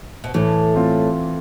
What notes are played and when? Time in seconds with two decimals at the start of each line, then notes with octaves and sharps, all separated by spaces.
0.24 B2
0.34 A2 E3
0.74 A3 C4 F4